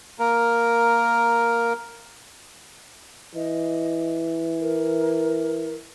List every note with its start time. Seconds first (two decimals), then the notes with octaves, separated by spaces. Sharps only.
0.19 A#3 A#4
3.35 E3 D#5
4.60 A#4